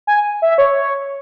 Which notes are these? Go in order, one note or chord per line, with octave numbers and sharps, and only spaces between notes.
G#5
E5
C#5